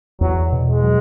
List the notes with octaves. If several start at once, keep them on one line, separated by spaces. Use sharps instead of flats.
E2 F#3
B2
G#3
F#3